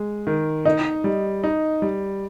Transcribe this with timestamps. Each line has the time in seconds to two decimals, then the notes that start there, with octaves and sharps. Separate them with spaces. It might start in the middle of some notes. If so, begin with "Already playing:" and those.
Already playing: G#3
0.27 D#3
0.65 D#4 D#5
1.04 G3
1.44 D#4
1.82 G3